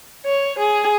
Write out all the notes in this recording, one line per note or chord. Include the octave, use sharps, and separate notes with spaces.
C#5
G#4